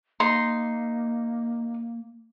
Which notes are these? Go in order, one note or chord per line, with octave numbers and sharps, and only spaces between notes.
A#3 D#4 C6